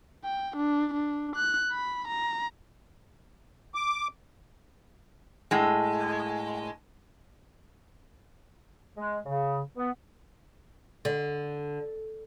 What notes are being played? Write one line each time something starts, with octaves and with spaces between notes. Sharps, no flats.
G5
D4
D4
F#6
B5
A#5
D6
A2 G#3
G#3
C#3
B3
D3